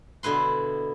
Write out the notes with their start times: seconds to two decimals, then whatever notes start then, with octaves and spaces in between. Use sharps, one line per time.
0.23 B2 D3 E4 B4 C6